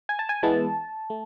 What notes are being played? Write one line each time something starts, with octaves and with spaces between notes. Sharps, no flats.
G#5
A5
G#5
E3 G#3 B3 E4 A5
A3